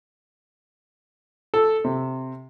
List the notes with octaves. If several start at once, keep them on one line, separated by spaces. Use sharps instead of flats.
A4
C3